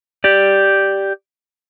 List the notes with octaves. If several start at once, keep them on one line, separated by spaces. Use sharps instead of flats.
G4 D5